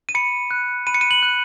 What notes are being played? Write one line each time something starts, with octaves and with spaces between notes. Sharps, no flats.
D#7
B5 C#7
F#6
B5 D#7
C#7
D#7
F#7
F#6